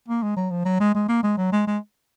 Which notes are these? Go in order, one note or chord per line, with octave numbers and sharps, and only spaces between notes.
A#3
G#3
F#3
F3
F#3
G#3
G#3
A#3
G#3
F#3
G#3
G#3